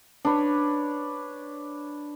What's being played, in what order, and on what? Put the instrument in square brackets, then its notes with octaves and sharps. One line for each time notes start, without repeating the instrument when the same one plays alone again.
[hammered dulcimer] D4 B4 C#5